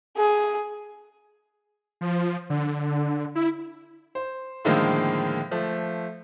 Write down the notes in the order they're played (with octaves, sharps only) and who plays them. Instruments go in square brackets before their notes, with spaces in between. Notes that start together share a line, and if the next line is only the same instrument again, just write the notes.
[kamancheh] G#4
[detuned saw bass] F3
D3
E4
[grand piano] C5
A2 D3 D#3 F3 G#3 A#3
F3 A3